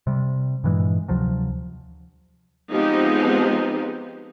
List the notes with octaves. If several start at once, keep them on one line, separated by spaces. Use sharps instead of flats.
C3 G3
G2 A#2 E3 G#3
D2 C3 F3 F#3
F3 G#3 B3 C4 D#4 G4